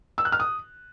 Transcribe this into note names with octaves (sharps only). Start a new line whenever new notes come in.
E6
F#6
F6
D#6